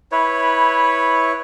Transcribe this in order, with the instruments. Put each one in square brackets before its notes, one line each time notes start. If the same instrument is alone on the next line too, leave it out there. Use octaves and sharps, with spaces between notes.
[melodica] E4 B4 C#5